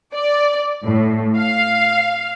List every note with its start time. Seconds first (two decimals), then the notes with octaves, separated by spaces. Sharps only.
0.14 D5
0.84 A2
1.37 F5